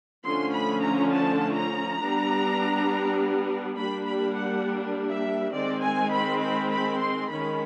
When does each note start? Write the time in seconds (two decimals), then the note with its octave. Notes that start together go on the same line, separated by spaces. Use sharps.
0.24 D3 F3 A3 C#4 C6
0.54 B5
0.83 A#5
1.13 A5
1.57 A#5
2.00 G3 B3 D4
3.77 G3 A#3 D4 B5
4.06 B5
4.36 F#5
5.09 E5
5.53 D#3 G#3 C4 D5
5.83 G#5
6.12 B5
6.41 B5
6.71 B5
7.00 C6
7.30 D#3 G#3 C#4 B5